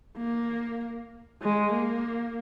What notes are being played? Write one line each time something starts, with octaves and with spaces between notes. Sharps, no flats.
A#3
G#3
A#3